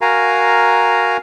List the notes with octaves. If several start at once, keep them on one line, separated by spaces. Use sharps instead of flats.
F#4 A#4 F5 G#5 A#5